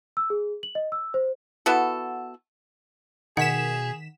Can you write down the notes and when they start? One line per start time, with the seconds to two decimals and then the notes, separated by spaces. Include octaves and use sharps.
0.17 E6
0.30 G#4
0.63 F#7
0.75 D#5
0.92 E6
1.14 C5
1.66 B3 E4 F#4 A4
3.37 B2 D#3 G#4 F#5 B6 E7